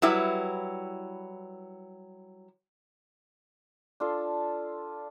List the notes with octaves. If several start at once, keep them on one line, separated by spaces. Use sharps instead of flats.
F#3 G3 E4 B4
D4 F4 A4 C6